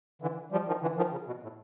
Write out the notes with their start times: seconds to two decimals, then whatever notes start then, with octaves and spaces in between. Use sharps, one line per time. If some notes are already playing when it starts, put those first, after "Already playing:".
0.22 D3 E3
0.52 F3 G3
0.67 D#3 F3
0.81 D3 E3
0.97 D#3 F3
1.12 C#3
1.27 B2
1.43 A2